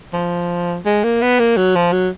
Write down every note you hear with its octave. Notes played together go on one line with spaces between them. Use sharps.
F3
G#3
A#3
B3
A#3
F#3
F3
F#3